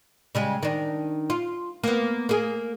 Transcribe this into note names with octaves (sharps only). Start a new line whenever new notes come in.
C#3 G3 G#3
D#3 D4
F4
A#3 B3
A#3 G#4